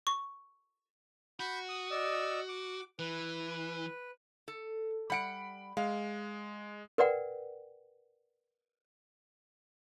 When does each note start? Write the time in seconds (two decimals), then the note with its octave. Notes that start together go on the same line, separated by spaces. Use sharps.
0.07 C#6
1.40 F#4 B5 G6
1.69 D#6
1.91 D5 D#5 E6
2.48 D6
2.99 E3 B4
4.48 A4
5.10 G3 F#5 B5 D7
5.77 G#3 F5
6.98 A#4 B4 D5 F#5 G5